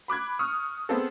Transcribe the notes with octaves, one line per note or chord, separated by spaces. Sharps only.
B5 D6 F#6 G#6
C#6 D#6 F6
B3 C4 G#4 A4